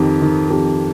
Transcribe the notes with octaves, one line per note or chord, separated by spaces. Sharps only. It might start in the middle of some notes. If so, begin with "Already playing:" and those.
Already playing: F2 D#3 G4
D#3
F2 G4